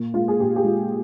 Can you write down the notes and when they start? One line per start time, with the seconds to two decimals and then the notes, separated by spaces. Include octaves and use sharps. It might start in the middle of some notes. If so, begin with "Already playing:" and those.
Already playing: A#2
0.14 G#3 F4
0.28 G#4
0.40 A#2 G4
0.56 G4
0.64 G#3 F4